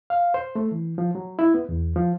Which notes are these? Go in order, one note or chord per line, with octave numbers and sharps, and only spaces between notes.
F5
C5
A3
E3
F3
F#3
E4
B3
E2
F3